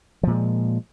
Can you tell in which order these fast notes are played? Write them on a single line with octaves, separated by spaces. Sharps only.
F3 A#2 G#3